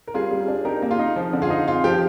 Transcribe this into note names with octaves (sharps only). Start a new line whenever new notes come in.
A#4
G3 F4 G#4
G3
D4
D#4 G4 A#4
A#3
F4 G#4
D#4
F3
D3
F4 G#4
D#4
C4 F4
F3 G4